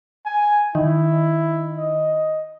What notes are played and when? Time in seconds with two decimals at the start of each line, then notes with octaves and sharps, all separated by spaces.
0.26 G#5
0.75 D#3 E4
1.78 D#5